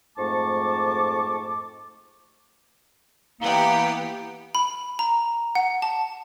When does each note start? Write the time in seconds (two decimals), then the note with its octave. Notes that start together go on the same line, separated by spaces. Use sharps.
0.17 F2 G#2 A3 A5 C#6 D6
3.41 E3 A#3 B3 G4
4.55 B5
4.99 A#5
5.55 F#5
5.82 A5